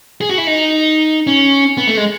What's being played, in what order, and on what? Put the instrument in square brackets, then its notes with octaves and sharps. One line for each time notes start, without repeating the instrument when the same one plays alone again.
[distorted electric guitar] G#4
F#4
E4
D#4
C#4
B3
A3
G#3